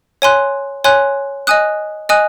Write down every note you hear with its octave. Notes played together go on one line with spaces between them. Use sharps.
C#5 G#5 C6 F#6
C#5 G#5 C6 F#6
D#5 G#5 D#6 F#6
D#5 G#5 D#6 F#6